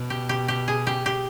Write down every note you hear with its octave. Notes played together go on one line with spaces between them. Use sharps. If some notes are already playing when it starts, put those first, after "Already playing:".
Already playing: B2
G4
G4
G4
G#4
G4
G4